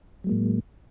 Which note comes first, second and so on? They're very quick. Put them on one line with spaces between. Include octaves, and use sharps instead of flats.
F#3 G#3 A#3 A2